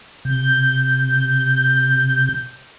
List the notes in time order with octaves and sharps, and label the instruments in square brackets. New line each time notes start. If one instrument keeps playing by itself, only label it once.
[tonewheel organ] C3 [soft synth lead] G6